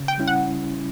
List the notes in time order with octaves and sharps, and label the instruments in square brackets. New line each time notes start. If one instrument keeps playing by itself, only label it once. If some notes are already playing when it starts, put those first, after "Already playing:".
Already playing: [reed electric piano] C#3
[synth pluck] G5
[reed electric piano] G3 C#4 E4
[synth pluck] F#5